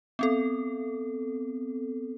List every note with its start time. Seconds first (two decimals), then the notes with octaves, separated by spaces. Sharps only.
0.19 B3 C4 A4